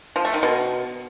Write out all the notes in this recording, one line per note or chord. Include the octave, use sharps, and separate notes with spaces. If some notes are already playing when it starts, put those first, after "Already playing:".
F3
A3
D#3
B2